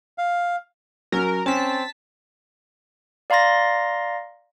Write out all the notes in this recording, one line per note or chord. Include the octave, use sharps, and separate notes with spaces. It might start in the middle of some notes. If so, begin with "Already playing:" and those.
F5
F#3 C#4 A#4
C4 C#4 A5 B6
D5 F5 A#5 C6 A6 A#6